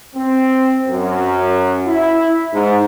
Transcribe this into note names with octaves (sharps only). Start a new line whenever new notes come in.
C4
F#2
E4
G#2